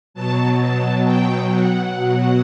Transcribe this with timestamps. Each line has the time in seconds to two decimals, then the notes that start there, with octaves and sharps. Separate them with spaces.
0.14 B2 F#3 A5
0.60 A5
1.05 G5
1.50 F#5
1.96 B2 F#3